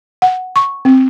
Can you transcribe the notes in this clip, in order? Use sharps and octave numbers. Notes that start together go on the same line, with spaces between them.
F#5
C#6
C4